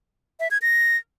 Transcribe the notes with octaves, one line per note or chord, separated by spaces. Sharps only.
E5
G#6
A#6